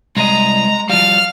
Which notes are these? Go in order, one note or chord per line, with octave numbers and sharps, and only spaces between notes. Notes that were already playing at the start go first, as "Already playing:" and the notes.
C2 G#3 D#5 A#5
F3 G3 F5 F6